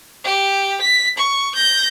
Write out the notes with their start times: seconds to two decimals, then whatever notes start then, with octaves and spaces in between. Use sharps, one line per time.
0.24 G4
0.81 B6
1.18 C#6
1.55 G6 A#6